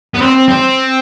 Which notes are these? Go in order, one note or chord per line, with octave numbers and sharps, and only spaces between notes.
B3
C4
C4